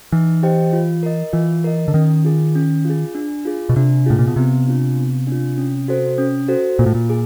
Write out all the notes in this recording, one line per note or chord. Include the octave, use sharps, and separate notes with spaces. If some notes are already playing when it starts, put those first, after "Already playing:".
E3 D#4
G4 C5 D#5 G5
F4
A#4 D#5
E3 F4
A#4 D#5
D3
D#3 C#4
F4 G#4
C#4
F4 G#4
D4
F4 G#4
B2
C3 D4
A2 F4 G#4
A#2
B2
C3 B3
D4 F4
B3
D4
F4
C#4
F#4 A4 C5
C#4
F#4 A4 C5
A#2 F4
A2
A#2
G#4